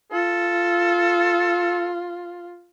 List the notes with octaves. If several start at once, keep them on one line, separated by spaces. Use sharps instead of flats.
F4 A4